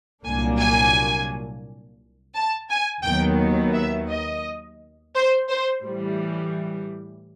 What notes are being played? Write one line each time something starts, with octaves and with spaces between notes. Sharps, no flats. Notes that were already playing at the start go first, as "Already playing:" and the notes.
C2 A#2 F#3 A#3 D4 G#5
G#5
A5
G#5
D#2 D#3 F#3 B3 G5
E5
D#5
C5
C5
A2 E3 G3